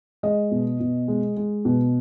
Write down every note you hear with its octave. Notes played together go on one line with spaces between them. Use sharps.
G#3 D#5
B2
B2
G#3
G#3
B2